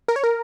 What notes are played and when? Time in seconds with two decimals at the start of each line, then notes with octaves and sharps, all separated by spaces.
0.08 A#4
0.16 C#5
0.24 A#4